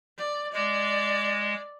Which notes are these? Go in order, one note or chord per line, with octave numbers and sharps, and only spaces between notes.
D5
G#3 D5